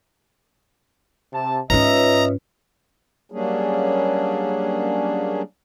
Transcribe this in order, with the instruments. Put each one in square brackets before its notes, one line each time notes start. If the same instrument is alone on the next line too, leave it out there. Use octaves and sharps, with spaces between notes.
[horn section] C3 A5
[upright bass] G#2 C#4 [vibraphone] F4 B4 C#5 [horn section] D#5 E5 [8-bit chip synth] A#5
[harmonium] F#3 G3 A#3 C#4 D4 G#4